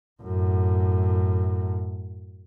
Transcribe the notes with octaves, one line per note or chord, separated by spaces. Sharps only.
F#2 A2